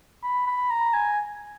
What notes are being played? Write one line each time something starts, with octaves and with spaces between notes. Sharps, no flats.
B5
B5
A#5
G#5